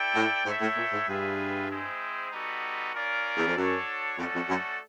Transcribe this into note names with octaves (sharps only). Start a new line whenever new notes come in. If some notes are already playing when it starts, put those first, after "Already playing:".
Already playing: E4 A4 D5 G5
A2
G#2 E4 A4 C#5 E5 G5
A2
A#2
G#2
G2 F4 G#4 B4 E5
G#3 C4 E4 G#4 C5
G3 B3 D#4 F#4 A4
C#4 F4 A#4 D5
E2
F2
F#2 D4 F#4 A4 C#5
F2 A3 C#4 F#4 A4 D5
F2
F#2